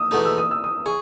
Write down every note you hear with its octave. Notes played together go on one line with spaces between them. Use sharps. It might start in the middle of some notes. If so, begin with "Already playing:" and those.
Already playing: D#6 E6
E2 B2 A3 D#4 D#6
E6
D#6
E6
D#6
G#4 C#6